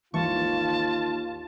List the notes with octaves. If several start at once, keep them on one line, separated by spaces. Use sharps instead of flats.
G#1 D#2 E3 F4 A5 C#6